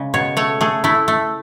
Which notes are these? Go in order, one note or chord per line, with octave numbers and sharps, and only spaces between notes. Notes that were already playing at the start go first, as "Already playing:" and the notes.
Already playing: C#3 G#3
B2 C#5
A3 C#5
A3 G#4
A3 E4
A3